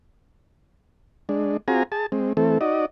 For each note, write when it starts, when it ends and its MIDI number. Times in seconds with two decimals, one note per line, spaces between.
1.29 1.57 56
1.29 1.57 62
1.68 1.83 60
1.68 1.83 65
1.68 1.83 66
1.68 1.83 68
1.68 1.83 80
1.68 1.83 82
1.92 2.06 68
1.92 2.06 81
2.12 2.33 56
2.12 2.33 60
2.37 2.58 52
2.37 2.58 57
2.37 2.58 60
2.37 2.58 69
2.61 2.86 63
2.61 2.86 66
2.61 2.86 74
2.61 2.86 75